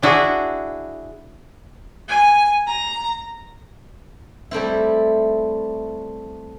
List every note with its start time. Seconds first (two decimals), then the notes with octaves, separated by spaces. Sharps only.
0.02 D4 E4 F#4 G#4
2.08 G#5
2.67 A#5
4.51 G3 A3 C4 E4